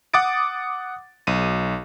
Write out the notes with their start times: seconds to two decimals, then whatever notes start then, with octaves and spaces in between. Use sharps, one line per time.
0.14 F#5 D6 D#6 A6 D7
1.27 B1 D#7